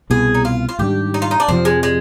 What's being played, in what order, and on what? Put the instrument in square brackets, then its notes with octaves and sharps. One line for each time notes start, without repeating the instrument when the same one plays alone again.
[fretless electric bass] C2 B2 B3 [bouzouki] G#4
[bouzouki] D#4
F4
F4
[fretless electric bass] G#2 D#3 G3 D4 [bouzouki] G4
[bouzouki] D#4
F4
D#4
D4
[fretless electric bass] F2 C3 F3 [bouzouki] C4
[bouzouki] G#3
G#3